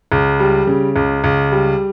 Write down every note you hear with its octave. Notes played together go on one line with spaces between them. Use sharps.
C#2
G3
C#3
C#2
C#2
G3